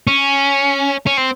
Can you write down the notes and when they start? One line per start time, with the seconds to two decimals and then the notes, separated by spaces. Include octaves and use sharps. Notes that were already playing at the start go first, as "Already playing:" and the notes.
0.07 C#4
1.06 C#4
1.17 C4